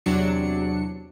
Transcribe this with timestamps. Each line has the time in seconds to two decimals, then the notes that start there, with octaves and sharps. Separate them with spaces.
0.06 E2 C3 F#3 D4 C#7